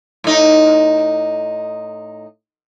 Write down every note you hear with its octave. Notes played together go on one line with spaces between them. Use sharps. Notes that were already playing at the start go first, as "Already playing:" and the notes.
A2 D#4